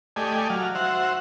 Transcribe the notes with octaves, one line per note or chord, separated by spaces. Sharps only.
A3 G4 D5 D#5 G#5
F#3 F5
F#4 C5 E5 F#5